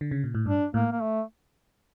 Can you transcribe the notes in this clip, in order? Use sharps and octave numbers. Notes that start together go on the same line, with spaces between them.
D3
C#3
A#2
A2
G2 D4
A2 A#3
A#3
A3